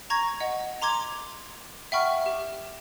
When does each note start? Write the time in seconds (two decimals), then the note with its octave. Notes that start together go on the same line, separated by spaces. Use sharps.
0.10 A#5 C#6 G#6 A#6
0.40 D#5 F#5
0.82 A#5 C6 D6 G#6
1.92 E5 F#5 G5 B5 C#6 F6
2.26 G4